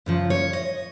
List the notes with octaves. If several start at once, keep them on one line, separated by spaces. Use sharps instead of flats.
F#2 C#3 F3
C#5
D#5